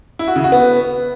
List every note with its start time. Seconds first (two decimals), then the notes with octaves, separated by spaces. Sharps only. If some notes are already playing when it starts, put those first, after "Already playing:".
0.19 E4
0.28 F#4
0.36 C#3
0.44 F#4
0.52 B3